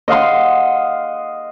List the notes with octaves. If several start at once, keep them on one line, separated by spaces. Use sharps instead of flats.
D#5 F5 F#5 C6